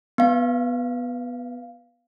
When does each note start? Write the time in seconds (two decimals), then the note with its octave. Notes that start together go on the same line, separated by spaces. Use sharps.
0.18 B3 F5